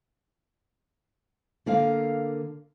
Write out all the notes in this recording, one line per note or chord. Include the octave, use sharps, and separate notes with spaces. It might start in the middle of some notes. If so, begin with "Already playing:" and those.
D3 A#3 A#4 F5